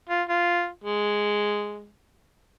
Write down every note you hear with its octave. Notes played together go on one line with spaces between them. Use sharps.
F4
F4
G#3